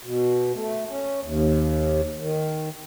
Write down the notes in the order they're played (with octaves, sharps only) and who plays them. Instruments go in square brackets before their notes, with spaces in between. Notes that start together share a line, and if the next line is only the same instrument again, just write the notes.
[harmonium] B2
A3
C#4
D#2
D#3